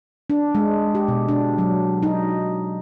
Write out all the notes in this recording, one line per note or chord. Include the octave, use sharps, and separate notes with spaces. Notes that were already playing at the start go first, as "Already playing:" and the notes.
D4
G#3
G4
B2
D4
F#3
D#4